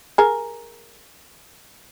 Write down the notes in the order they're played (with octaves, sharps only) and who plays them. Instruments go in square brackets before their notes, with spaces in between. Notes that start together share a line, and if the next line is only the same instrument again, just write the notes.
[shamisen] G#4 A#4